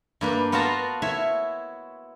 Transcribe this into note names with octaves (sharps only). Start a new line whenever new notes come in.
G2 A#3 B4
B3 F4 F#4 F5 A5 A#5
E4 C#5 E5